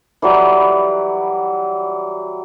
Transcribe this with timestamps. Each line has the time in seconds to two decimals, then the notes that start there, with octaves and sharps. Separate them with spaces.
0.22 E3 F#3 G3 B4